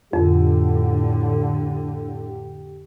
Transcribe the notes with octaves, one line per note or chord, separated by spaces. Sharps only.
F2 A2 D3 G4